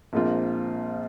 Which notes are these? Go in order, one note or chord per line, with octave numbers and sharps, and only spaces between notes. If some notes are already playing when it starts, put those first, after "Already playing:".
A#1 A#2 G#3 C4 F4